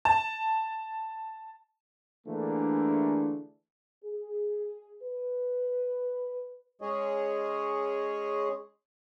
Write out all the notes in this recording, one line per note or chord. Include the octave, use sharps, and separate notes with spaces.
A5
D3 E3 A3 A#3 D4 G#4
G#4
B4
G#3 C#4 G#4 C#5 D#5